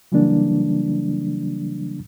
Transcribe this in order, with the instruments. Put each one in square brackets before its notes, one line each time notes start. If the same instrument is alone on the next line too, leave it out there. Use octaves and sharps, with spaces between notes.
[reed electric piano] C#3 E3 F#3 G3 A#3 D4